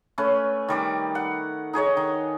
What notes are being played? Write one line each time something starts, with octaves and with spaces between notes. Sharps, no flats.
A3 C#4 B4
D#3 G3 D6
F#5
D#4 G#4 C#5 D#5
D#3